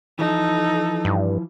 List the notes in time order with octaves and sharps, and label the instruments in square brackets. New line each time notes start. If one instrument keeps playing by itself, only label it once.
[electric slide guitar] E3 F3 [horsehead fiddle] D#4 A4
[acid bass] G2